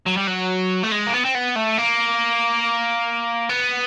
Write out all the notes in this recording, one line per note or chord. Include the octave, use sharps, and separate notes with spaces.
F#3
G3
F#3
A3
G#3
A#3
B3
C4
B3
A3
A#3
B3